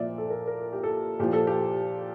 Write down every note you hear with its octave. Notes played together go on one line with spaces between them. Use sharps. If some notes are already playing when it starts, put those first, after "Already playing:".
Already playing: A#2 F3 D5 E5
A4
A#4
A#4
G4
A4
A#2 F3 G4
A4
G4